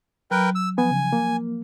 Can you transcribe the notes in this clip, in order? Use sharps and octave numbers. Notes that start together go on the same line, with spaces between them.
F#3 A#4 B4 G5 F#6
E6
F3 B3 G#5
C#3
A#3